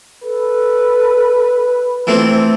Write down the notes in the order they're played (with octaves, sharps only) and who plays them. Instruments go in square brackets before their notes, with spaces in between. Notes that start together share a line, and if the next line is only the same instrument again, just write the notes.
[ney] A4 [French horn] B4
[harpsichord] E3 A3 C4 [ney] C5